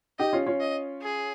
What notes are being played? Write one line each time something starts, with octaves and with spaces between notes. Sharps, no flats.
D#4 G4 D#5
C#4 F4
C#4 F4
D#5
G#4